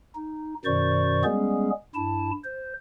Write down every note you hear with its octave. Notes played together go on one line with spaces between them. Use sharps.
D#4
F#2 B2 D#3 C5 D5 C#6
G3 G#3 B3 C#4 G#4
G2 E4 A5
C5